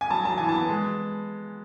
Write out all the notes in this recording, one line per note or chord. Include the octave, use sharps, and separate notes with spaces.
G#5
F#3 A5
F#3 A5
E3 G#5
A5
B3
G#3